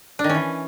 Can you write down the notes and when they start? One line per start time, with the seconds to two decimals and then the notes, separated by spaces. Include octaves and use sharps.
0.19 D4
0.24 D#3
0.29 C#4
0.35 E3